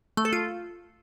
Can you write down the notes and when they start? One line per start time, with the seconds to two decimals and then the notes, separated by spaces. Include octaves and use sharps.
0.17 A3
0.25 A4
0.33 F4